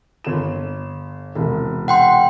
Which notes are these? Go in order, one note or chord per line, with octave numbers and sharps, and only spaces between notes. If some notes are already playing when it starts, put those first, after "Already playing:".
G1 E7
E1 C2
F#5 G5 C6